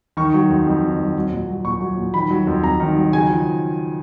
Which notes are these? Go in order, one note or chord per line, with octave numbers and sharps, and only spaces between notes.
D#3 C#6
F#3
F2
F2
D#3
F#3
F#3
A#2
F#3
A#2 C#6
F#3
A#2
D#3 B5
F#3
F2
F2 A#5
D#3
F#3
C#3 G#5
F3